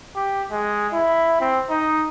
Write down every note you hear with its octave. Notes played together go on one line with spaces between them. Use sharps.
G4
G#3
E4
C4
D#4